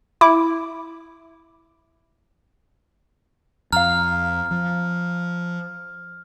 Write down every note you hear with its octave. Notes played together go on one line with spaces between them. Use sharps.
E4 D6
F2 F5 A#5 F6
F3